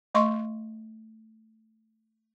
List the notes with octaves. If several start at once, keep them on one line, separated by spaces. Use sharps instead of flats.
A3 D#5 C6 C#6